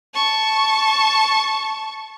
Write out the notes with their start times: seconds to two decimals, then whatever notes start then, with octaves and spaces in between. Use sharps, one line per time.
0.14 A5 C#6